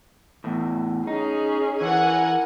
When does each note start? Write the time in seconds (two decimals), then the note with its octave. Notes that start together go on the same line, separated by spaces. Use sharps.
0.44 E2 A2
1.07 C#4 D#4 G#4
1.81 E3 A#4 F#5 G#5